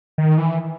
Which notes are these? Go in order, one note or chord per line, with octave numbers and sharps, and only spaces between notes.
D#3
E3